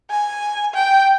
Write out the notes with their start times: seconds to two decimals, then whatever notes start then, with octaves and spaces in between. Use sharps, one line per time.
0.10 G#5
0.74 G5